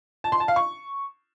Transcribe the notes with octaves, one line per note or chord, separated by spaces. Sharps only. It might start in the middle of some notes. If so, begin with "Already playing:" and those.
A5
C6
A5
F5
C#6